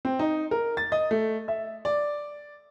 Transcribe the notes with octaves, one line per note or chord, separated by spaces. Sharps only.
C4
D#4
A#4
A6
D#5
A3
E5
D5